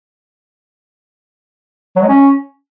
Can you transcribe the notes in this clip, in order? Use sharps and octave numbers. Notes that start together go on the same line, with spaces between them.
F#3
G#3
C#4